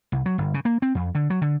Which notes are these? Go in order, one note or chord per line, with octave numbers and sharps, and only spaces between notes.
C2
F#3
G1
C#3
A#3
C4
F2
D3
F#3
D3